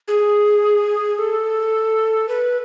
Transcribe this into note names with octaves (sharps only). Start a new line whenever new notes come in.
G#4
A4
B4